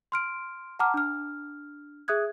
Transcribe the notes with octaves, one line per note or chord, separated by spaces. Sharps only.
C6 F6 D7
F#5 A5 A#5 D6 F6
D4 F6
G#4 E5 D#6 F#6 G#6